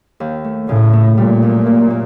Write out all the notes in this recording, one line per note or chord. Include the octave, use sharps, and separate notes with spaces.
D#2
A3
A2 C#3
A3
A#2 G3
F#2
A#3
A#3